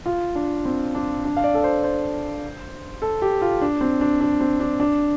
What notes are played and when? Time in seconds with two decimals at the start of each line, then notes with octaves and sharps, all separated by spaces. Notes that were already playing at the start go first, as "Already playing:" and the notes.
0.06 F4
0.35 D4
0.65 C4
0.95 D4
1.24 D4
1.37 F5
1.44 D5
1.55 A4
1.64 C5
1.84 C5
3.02 A4
3.22 G4
3.42 F4
3.61 D4
3.81 C4
4.01 D4
4.21 D4
4.41 C4
4.60 D4
4.80 D4